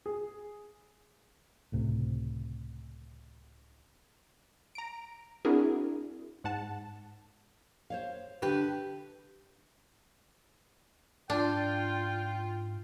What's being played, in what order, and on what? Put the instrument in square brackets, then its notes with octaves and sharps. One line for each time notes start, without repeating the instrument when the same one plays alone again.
[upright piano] G#4
[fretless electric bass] C#2 A2 C3
[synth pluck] A#5 D7
C4 D4 E4 F#4 G#4 A#4
G#2 F#5 A5
[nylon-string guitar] C5 C#5 F5
[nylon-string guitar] D3 D4 [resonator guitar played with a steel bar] G4 B4
[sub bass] G#2 [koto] D4 [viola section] F4 [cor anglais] G5